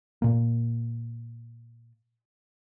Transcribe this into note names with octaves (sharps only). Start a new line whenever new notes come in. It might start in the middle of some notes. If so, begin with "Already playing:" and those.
A#2 A#3